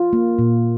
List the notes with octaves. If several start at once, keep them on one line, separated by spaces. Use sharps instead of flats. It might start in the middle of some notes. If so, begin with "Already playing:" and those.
Already playing: F4
A#3
A#2